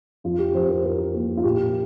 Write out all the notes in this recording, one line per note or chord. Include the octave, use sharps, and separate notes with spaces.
F2 F4
G4
F2 C5
G4
A#4
F3 A#4
A#3
F4
A#2 G4